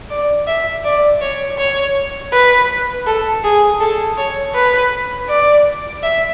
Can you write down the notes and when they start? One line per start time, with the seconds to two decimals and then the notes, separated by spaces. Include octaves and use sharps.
0.10 D5
0.47 E5
0.84 D5
1.21 C#5
1.58 C#5
2.32 B4
3.07 A4
3.44 G#4
3.80 A4
4.17 C#5
4.55 B4
5.29 D5
6.03 E5